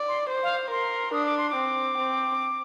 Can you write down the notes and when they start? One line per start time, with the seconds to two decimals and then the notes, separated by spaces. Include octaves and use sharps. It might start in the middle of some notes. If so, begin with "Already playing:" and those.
Already playing: D5
0.08 C6
0.29 C5
0.43 F5
0.70 A#4 C6
1.13 D4 D#6
1.26 D6
1.38 C6
1.50 D6
1.55 C4
1.97 C4